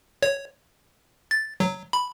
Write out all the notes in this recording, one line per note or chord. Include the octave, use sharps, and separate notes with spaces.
C#5
A6
F#3
B5